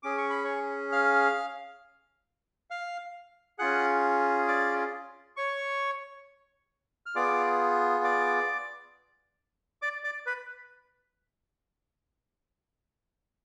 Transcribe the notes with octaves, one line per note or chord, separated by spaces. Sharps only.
C#4 G#4 D6
C#6
B5
C#5 C#6
F5 F6
F5 F6
C#4 F4 G#4 F#5 F#6
D5 D6
C#5 C#6
F6
B3 F4 G#4 D5 D6
D5 D6
D5 D6
D5 D6
B4 B5